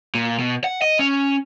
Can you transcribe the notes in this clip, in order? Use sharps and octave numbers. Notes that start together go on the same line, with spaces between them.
A#2
B2
F#5
D#5
C#4